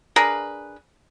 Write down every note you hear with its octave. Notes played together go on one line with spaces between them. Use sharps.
D4 G#4 A#4 B4